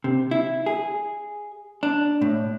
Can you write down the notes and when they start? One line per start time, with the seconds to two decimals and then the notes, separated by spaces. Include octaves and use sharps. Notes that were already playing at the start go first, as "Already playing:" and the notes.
0.04 C3
0.31 E4
0.66 G#4
1.83 D4
2.22 A2